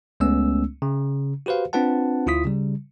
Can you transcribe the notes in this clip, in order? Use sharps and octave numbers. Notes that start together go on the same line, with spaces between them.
C#2 G#3 A3 B3 C#4 E6
C#3
F#4 G4 B4 C5 F5
C4 D4 F4 B4 F#5 A5
D2 E4 F4 D#6 B6
C#3 G3